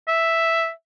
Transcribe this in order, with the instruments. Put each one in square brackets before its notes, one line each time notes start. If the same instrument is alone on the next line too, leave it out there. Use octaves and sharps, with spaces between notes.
[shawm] E5